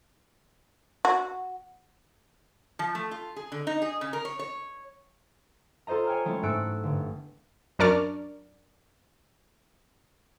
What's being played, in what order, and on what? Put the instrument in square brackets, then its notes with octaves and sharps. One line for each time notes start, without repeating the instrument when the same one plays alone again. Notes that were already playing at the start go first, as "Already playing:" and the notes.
[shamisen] F#4
[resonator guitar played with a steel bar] F3
A3
F4
G#4
D3
D#4
G#4
C#3
A#4
C#5
C#5
[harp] F4 A4 C5 D#5 A#5
C#5 G5 G#5 F6
F#3 G#3 A3 C#4 E4 C#5
G#2 A3 E6 F#6 C#7 D7
G1
[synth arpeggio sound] F#2 D4 A#4 D5 C#6 F6